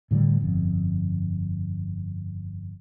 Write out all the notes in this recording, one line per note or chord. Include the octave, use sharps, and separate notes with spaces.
A2 D3 D#3 G3
G1 F2